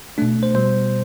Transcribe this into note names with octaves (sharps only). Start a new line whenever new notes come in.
B2 A3 D4
C5
B2 G3 C5